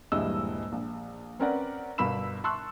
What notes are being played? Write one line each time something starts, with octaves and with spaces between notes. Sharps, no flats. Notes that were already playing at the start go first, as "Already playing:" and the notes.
D#1 G2 E3 G#3 D#5 E6
A#1
C4 C#4 A#4 B4 D5 F#5
G1 B2 A#4 B5 E6 E7
A5 C6 C#6 E6 F#6